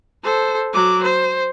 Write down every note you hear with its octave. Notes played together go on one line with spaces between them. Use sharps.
A4 C5
F#3 D6
C5